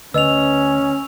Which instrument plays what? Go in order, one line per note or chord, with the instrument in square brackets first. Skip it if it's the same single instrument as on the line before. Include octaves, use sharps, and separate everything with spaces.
[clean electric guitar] D2 [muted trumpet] C#4 [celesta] B4 D#5 [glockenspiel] E6 F7